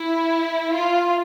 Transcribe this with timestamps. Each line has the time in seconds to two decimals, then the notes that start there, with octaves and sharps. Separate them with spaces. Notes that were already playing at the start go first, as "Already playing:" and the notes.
Already playing: E4
0.74 F4